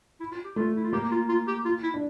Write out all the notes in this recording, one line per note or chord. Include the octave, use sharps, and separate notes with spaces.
E4
F4
G4
A3 F4
E4
F4
A#3 G4
F4
F4
G4
F4
E4
D4